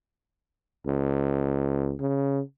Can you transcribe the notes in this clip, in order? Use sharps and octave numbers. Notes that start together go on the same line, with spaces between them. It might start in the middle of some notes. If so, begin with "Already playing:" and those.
C#2
C#3